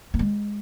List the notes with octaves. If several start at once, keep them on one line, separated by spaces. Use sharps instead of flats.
A#3
G#3